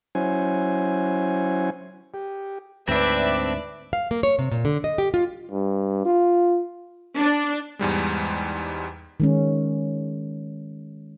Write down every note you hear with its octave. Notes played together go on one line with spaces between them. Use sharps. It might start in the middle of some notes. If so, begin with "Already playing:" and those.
F#3 C#4 E4 C5 G#5
G4
D2 G#2 C4 D4 B4 D5 E5
F5
A#3
C#5
C3
A#2
D3
D#5
G4
F4
G2
F4
D4
E2 G#2 G3 G#3
D#3 G#3 C#4